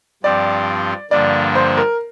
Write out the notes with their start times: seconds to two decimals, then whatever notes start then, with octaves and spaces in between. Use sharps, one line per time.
0.23 G2 F3 C4 G4 D5
1.11 G2 D3 F3 A#3 D4 D5
1.55 C5
1.77 A#4